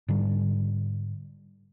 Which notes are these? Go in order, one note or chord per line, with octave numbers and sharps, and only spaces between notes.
G#2 D3 G3